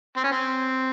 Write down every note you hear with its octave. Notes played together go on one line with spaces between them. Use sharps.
C4
C#4
C4